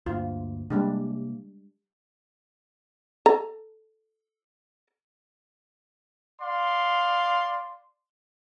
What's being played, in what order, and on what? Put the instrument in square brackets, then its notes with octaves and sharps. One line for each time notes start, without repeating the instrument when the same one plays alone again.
[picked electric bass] D2 G2 A#3 [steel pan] F4
[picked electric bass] C3 A#3 [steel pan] G3 G#3 D4
[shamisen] A4 A#5
[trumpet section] D5 F5 C6